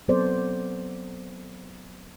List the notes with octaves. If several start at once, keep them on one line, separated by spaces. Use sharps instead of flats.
F#3 B3 C4 A4 C5 D5